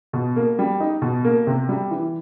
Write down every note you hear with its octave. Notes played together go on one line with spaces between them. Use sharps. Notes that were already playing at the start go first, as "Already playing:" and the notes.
B2
A#3
G3
D#4
B2
A#3
C3
G3
E3